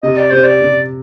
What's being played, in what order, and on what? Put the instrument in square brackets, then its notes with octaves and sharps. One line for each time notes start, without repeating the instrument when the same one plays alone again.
[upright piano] C3 [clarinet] D#5
[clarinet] D5
[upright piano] C3 [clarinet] C5
[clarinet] D5
[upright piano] C3